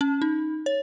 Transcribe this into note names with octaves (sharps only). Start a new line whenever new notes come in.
C#4
D#4
C#5